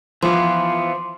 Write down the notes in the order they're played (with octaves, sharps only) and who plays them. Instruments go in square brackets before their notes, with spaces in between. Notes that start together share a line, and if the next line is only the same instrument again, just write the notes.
[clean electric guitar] E3 B3 [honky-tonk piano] F3 [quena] F5 [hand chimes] C6 D6